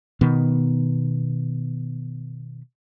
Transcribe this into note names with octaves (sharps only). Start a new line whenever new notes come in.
B2 D#3 B3